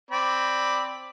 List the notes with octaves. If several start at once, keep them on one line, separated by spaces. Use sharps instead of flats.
C4 D5 B5